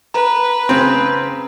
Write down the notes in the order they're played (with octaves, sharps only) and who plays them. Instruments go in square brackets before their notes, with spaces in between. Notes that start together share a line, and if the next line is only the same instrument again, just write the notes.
[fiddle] B4 [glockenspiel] A#5
[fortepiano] C#3 C4